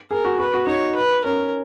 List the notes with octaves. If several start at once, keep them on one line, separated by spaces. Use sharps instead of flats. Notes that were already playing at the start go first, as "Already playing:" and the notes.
G#4 A#4
F#4
F#4 B4
F#4
D#4 C#5
B4
C#4 A#4